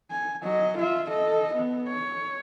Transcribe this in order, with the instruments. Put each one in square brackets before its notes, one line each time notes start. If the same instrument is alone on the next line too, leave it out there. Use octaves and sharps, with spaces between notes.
[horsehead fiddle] G#5
F#3 D#5
F4 E5
A4 D#5
B3
C#5